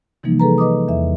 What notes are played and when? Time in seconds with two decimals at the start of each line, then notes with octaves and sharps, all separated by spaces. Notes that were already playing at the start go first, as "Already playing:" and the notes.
0.23 C3 E3 F3 G3 A#3 D#4
0.40 G#4 A4 B4 A#5
0.58 B4 D#5 D6 D#6
0.88 E2 E5